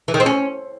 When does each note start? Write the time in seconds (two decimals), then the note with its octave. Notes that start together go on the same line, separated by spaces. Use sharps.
0.08 E3
0.14 D#3
0.20 C4
0.26 C#4